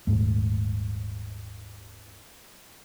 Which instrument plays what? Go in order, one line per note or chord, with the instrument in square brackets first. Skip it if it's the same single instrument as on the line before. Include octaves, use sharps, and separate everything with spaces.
[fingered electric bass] D#1 E2 G#2 A3